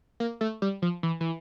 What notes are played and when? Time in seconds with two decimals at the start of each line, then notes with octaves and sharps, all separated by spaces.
0.20 A#3
0.41 A3
0.62 G3
0.82 F3
1.03 E3
1.20 E3